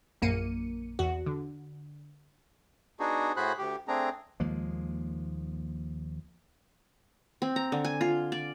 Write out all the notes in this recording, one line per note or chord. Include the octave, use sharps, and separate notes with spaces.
A#1 F#2 A#3 C#7 D#7
E2 F#4
D3
B3 D4 D#4 F#4 G#4
A2 F#4 G#4 C5 B5 F#6
D2 G4
A3 C4 D4 G#4 A#5
D#2 F3 G#3 A#3
C4
A#5
D3
G#5
F4
D5